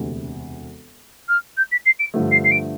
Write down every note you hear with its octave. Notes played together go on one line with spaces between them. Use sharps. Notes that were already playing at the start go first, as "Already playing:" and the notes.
Already playing: E1 D2 C3
F6
G6
B6
C7
D7
G2 D3 F3 A3
C7
C7
D7